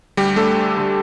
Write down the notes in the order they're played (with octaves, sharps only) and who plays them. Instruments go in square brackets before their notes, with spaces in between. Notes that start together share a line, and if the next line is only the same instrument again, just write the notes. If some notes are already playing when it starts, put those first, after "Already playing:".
[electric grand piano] D2 G3 G4
D3 G3 A3 A4
D2
D3 G3